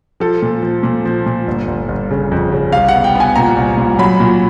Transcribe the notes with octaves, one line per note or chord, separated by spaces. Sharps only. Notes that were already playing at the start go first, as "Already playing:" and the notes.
F3 A4
A#2
F3
A#2
F3
A#2
G1
G1
G1
C#3
F2
C#3
C2 F5
F#5
B3
G5
B3 G#5
A#2 A#5
C2
A#2
F#3 B5
A#2